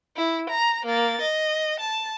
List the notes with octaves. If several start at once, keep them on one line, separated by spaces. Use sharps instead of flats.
E4
A#5
A#3 A6
D#5
A5